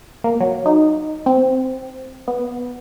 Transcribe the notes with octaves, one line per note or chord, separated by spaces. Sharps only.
A#3
F#3
D#4
C4
B3